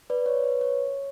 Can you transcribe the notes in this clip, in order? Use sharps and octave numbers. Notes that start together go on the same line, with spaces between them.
B4 D5
C#5
B4
C#5